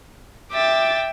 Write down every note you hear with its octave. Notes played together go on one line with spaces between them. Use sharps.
E5 G5 D6 A6